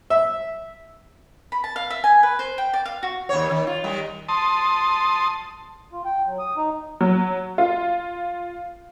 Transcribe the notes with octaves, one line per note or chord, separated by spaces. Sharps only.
E5
B5
A5
F5
E5
G#5
B4
C5
G5
D5
F5
F#4
D#2 C#5
D#3
F4
D#3 G3
A5 C6 D#6
F4
G5
F#3
D#6
D#4
F#3
F4